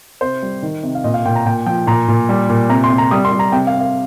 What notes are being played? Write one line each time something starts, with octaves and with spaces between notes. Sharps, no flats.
C3 C5
G3
D#3
C3
F5
A#2 D#5
F5
A#2 G5
A#5
A#2 G5
F3 G5
A#2 A#5
A#2
G3
A#2
C3 A#5
C6
C3
A#5
G3 D#6
C6
G3
A#5
C3 G5
F5
C3
F5